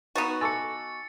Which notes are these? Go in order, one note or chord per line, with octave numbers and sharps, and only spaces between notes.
B3 D#4 F#4 B4 C#6 A6
G#5 A5 C#6 D6 E6 A6 C#7